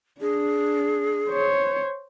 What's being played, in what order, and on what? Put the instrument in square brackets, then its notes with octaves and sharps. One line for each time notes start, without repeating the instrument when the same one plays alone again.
[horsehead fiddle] D4 [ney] G#4
[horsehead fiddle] C5 C#5